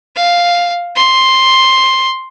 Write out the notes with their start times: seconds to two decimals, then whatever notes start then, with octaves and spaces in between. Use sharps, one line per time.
0.16 F5
0.96 C6